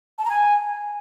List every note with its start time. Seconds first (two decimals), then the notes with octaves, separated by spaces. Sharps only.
0.19 A5
0.24 A#5
0.29 G#5